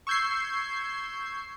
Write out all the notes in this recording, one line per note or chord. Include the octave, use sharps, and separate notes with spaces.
C#6 E6 G6 G#6 C7